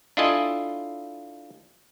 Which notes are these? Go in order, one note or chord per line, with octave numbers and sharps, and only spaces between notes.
D4 E4 F4 A4 D#5 G#5